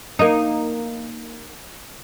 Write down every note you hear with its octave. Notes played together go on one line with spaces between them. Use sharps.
A#3 D#4